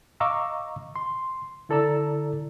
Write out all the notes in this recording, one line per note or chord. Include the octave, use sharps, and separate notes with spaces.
D#5 F5 A#5 C#6 D6 E6
C6
D3 E4 A4 D5 A#5 E6